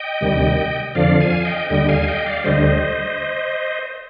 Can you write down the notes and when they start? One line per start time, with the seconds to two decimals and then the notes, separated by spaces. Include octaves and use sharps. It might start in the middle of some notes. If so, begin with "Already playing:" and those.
Already playing: D#5 G5
0.21 D2 C3 D#3 G3
0.95 F2 D3 F3 D5 F5
1.20 F5 G#5
1.45 D#5 G5
1.70 D#2 D3 G3 D#5 G5
1.88 F5 G#5
2.07 D#5 G5
2.26 D5 F5
2.44 D2 D3 G3 C5 D#5